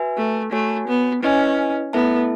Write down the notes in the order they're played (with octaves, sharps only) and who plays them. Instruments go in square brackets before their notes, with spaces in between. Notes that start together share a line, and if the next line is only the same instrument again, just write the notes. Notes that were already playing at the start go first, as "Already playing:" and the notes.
Already playing: [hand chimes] F#4 B4 E5 G#5
[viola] A3
[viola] A3 [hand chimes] F#4 C#5 G#5
[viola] B3
[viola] C#4 [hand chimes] E4 B4 D#5 G#5
[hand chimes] A3 E4 A4 E5 A5 [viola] B3